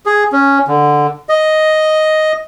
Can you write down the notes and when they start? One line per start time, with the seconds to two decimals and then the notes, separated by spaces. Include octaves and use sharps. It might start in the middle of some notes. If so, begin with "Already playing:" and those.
0.06 G#4
0.32 C#4
0.68 D3
1.29 D#5